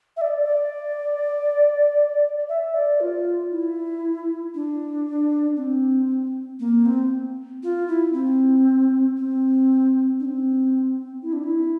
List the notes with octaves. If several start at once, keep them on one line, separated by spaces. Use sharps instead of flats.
E5
D5
D5
E5
D5
F4
E4
D4
C4
A#3
C4
F4
E4
C4
C4
D4
C4
E4
D4
E4